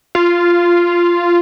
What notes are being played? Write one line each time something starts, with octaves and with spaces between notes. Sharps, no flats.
F4